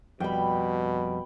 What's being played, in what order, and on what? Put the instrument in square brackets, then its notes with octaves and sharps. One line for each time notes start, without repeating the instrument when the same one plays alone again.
[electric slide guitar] F2 G3 [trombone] B2 [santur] G5 B5